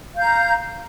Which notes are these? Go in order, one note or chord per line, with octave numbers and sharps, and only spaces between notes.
F5 A#5 G6